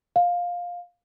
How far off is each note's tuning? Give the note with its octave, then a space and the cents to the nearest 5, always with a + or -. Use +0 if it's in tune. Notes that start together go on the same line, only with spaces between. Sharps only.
F5 +10